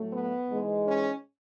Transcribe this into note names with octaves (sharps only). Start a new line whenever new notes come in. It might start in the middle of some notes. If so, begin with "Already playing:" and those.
Already playing: A2 F#3 A3
B3
G#2 E3 G#3
C#4